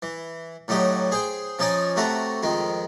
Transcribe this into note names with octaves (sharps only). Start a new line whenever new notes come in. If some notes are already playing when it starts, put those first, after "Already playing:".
E3
A2 D3 F#3 D#4 G4
G#4 C5 G5
F3 C#4 D#4 D5 G#5 D#6
C3 A3 F#4 A4 A#5
F2 D#3 G#3